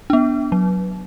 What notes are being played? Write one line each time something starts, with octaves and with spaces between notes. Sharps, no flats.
B3 D4
F#3